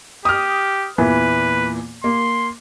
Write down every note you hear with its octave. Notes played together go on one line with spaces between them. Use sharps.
G4 D#6 F6
E2 A#2 E3 B4
A#3 C6